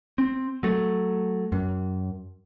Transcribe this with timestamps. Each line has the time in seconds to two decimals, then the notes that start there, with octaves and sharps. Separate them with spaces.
0.18 C4
0.63 F#3 A3
1.52 F#2